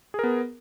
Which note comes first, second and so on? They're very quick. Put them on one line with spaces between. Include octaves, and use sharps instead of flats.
G#4 A#4 B3